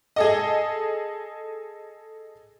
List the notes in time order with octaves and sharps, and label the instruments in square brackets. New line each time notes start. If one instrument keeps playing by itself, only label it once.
[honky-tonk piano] G#4 A4 D#5